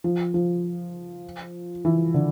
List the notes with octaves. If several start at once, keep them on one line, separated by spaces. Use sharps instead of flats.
F3
F3
E3
D3